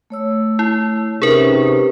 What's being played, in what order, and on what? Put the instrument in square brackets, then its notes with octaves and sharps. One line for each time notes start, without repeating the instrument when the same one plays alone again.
[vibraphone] A3 C#5 E6
[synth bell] E4
[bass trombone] C3 [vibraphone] C#4 D#4 B4 [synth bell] G#4 A#4